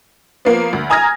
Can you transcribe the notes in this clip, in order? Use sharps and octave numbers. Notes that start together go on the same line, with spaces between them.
F3 A#3 B3
D2
G#5 A#5 D#6 F6 G#6 A#6